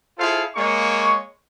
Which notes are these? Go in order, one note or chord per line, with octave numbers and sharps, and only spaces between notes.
E4 F4 G#4 A4 C5 F5
G#3 A#3 C#5 C#6